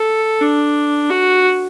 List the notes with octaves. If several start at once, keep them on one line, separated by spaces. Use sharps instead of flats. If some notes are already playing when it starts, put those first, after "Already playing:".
Already playing: A4
D4
F#4